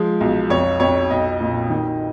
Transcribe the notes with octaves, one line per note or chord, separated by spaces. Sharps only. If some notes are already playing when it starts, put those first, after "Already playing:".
Already playing: F3 G#3
B1
F2 C#5
F2 C#5
B1 D#5
A#2
D#3